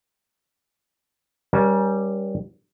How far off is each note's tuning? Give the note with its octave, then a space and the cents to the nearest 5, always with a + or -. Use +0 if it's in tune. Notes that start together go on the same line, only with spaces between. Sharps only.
G3 +0 C#4 +0 A#4 +40